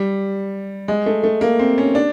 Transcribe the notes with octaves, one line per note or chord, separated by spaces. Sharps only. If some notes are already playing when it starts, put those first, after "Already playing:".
Already playing: G3
G#3
A3
A3
A#3
C4
C#4
D4